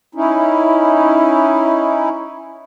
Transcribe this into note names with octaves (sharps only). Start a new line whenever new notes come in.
C#4 D#4 E4